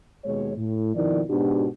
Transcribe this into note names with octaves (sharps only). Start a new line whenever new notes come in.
D#2 B2 G#3 C#5
A2
F2 B2 D#3 F3 E4 D5
G#2 B2 D4 F#4 G4